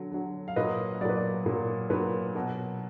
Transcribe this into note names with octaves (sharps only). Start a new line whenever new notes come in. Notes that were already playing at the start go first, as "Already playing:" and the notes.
Already playing: D3 F#3
D3 F#3
F5
A#2 F#3 B4 D#5
A#2 F#3 B4 D5
D5
A#2 F#3
A#2 F#3 B4
B2 F#3